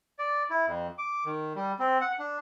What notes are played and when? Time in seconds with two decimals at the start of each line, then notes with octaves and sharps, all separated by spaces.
0.19 D5
0.50 E4
0.67 F2
0.98 D6
1.25 D#3
1.56 G3
1.79 C4
2.01 F#5
2.19 D4